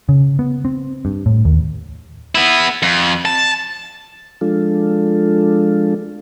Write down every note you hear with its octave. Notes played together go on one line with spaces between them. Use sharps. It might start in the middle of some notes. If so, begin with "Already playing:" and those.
C#3
B3
C4
G2
A2
D#2
B3 E4
F2
A5
F3 G#3 D4 F4 A4